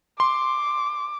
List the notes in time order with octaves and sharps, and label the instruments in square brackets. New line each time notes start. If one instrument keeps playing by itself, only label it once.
[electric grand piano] C6 [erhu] D6